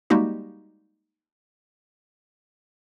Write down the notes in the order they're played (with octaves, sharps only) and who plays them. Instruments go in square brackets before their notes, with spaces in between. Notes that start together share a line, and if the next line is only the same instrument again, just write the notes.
[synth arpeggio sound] G3 G#3 A#3 D#4 F#4 G4